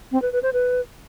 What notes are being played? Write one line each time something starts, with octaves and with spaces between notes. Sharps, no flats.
C4
B4
B4
C5
B4